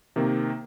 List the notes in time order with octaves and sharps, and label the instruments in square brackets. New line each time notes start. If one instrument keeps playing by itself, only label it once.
[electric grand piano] C3 D#3 A#3